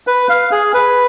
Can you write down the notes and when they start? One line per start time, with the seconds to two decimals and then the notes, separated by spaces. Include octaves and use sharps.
0.07 B4
0.29 F5
0.52 G#4
0.74 B4